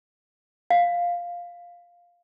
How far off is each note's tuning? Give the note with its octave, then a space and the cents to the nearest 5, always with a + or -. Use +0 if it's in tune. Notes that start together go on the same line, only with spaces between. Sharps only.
F5 +5